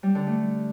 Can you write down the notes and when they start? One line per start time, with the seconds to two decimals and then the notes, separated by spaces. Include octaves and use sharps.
0.03 G3
0.15 D3
0.27 A3